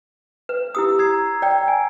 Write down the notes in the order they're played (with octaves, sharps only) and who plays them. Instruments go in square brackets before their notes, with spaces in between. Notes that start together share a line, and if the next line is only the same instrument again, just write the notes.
[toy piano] B4
[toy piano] E4 G4 D#6 [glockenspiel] E6
[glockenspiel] A#5 G#6 C7
[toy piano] D5 G5
G#5